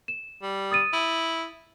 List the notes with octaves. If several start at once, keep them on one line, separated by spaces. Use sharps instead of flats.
E7
G3
D#6 A6 D#7
E4